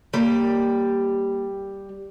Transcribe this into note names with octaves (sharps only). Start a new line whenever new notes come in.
G3 A#3